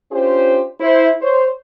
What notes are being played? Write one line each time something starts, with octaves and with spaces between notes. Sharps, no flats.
C#4 D4 F4 G4 C5
E4 C5
C5 C#5